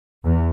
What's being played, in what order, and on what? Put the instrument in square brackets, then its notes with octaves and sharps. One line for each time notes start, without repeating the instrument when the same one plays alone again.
[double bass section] E2